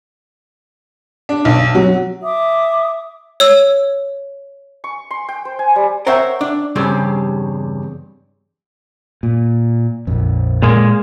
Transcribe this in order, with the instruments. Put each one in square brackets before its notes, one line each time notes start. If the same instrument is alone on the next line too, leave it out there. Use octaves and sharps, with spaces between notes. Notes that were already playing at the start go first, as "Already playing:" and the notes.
[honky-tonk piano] D4
B1
F#3
[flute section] E5 D6 D#6
[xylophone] C#5 E6
[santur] C#6
C6
G5
C5
G#5
G3
[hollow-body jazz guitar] A#4 C5 C#5 E5 F#5 G5
D4
E2 G2 C#3 G3 C4
[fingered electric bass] A#2
A#1 F2
[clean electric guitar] A#2 G#3 A#3